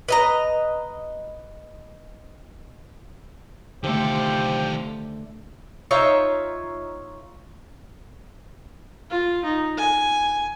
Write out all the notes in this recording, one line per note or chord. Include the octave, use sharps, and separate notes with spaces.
B4 D#5 A#5
D3 D#3 A3 C4 F4 G4 A4 C5
D#4 F4 C#5 E5
F4
D#4
G#5